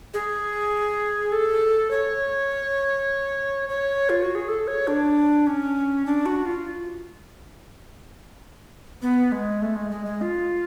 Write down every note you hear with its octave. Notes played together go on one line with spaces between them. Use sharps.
G#4
A4
C#5
C#5
F4
F#4
G#4
A4
C#5
D4
C#4
D4
F#4
F4
B3
G#3
A3
G#3
G#3
G#3
F4